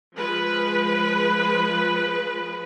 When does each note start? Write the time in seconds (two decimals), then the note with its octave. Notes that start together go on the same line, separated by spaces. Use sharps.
0.14 F3 G#3 B4